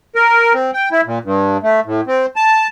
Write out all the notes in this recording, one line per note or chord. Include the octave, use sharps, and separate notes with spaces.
A#4
C4
G5
E4
A#2
G2
A3
A2
C4
A5